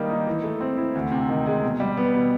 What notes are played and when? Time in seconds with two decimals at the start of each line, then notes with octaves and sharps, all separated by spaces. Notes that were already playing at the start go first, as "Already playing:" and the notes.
Already playing: D#3 G3 A#3 D#4
0.10 D#4
0.27 E3
0.44 A3
0.61 C4
0.77 E4
0.95 D2
1.11 C3
1.29 D#3
1.46 G#3
1.62 B2
1.80 G3
1.97 B3
2.14 B2